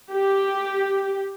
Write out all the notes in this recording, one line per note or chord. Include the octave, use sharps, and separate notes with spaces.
G4